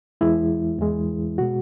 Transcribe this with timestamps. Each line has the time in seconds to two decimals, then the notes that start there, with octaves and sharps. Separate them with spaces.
0.21 E2 E3 G#3 E4
0.79 E2 E3 G#3
1.38 B2 G#3 F#4